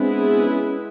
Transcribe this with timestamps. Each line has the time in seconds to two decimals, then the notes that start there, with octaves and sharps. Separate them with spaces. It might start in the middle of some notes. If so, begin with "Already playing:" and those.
Already playing: G#3 B3 C4 D4 E4 G#4 B4
0.44 C#4